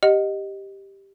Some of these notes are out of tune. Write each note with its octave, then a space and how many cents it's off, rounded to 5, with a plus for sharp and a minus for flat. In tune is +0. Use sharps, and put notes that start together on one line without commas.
G4 +0 D#5 +0 F#5 +0